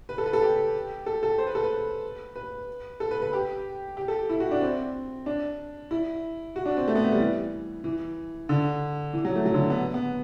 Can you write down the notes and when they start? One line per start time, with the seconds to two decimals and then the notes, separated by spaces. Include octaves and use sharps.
0.09 B4
0.18 A4
0.26 B4
0.33 A4
0.42 G4
1.06 A4
1.23 A4
1.38 C5
1.47 B4
1.55 A4
1.64 B4
2.36 B4
3.00 A4
3.11 B4
3.22 B4
3.33 G4
3.97 G4
4.08 A4
4.29 E4
4.40 F#4
4.51 D4
4.61 C4
5.26 D4
5.91 E4
6.56 F#4
6.66 D4
6.77 C4
6.88 A3
6.95 B3
7.04 A3
7.12 G3
7.20 E3
7.84 E3
8.49 D3
9.13 E3
9.25 F#3
9.35 A3
9.46 F#3
9.54 D3
9.70 B3
9.94 B3